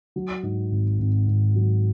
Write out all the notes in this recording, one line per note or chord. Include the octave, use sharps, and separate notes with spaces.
F#3
G#2
G#1
G#1
G#1
F#3